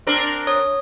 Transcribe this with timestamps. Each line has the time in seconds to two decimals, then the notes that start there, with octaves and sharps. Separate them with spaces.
0.07 C4 D4 A#4
0.47 C#5 D#6